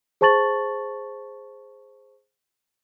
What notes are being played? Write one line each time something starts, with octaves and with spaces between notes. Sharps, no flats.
G#4 C5 A5 C#6 A6 F#7